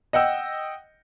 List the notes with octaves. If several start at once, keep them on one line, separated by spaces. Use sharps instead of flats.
D#5 F#5 G5 E6